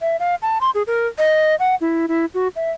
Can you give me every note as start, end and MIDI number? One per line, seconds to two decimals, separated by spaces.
0.01 0.16 76
0.20 0.35 77
0.42 0.58 81
0.61 0.70 84
0.75 0.83 68
0.87 1.07 70
1.18 1.55 75
1.60 1.75 78
1.81 2.06 64
2.08 2.26 64
2.34 2.48 66
2.56 2.71 76